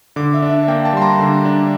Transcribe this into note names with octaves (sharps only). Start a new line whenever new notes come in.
D3 D6
E5
D4
E5
A#3 G5
A5
G3 C6
A#5
D3
D4